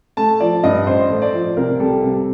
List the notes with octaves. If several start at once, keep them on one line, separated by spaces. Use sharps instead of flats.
A3 A5
F3 D5
G2 D#5
A1 C5
A3
D5
F3
C2 A#4
G3 A4
C3